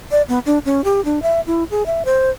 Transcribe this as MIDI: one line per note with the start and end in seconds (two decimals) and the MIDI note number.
0.11 0.22 74
0.29 0.39 59
0.46 0.59 62
0.65 0.84 61
0.84 1.03 67
1.05 1.19 62
1.22 1.40 76
1.47 1.64 64
1.71 1.83 68
1.86 2.03 76
2.05 2.30 72